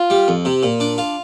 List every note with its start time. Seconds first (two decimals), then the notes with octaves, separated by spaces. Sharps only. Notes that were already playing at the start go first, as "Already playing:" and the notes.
Already playing: F4
0.10 G3
0.28 F2
0.45 C3
0.63 A#2
0.80 D4
0.98 F4